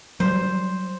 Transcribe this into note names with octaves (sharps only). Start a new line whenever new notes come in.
F#3 G3 C5